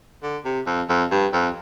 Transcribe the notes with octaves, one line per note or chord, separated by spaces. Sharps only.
D3
C3
F2
F2
G2
F2